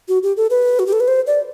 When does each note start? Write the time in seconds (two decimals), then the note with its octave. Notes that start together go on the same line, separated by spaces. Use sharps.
0.09 F#4
0.23 G4
0.37 A4
0.50 B4
0.79 F#4
0.86 G4
0.93 A4
1.00 B4
1.08 C5
1.27 D5